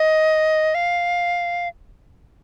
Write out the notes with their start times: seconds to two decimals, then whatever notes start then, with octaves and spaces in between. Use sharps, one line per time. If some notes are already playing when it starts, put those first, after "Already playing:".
Already playing: D#5
0.75 F5